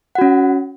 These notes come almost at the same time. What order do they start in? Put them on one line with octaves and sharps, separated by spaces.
F#5 F#4 C#4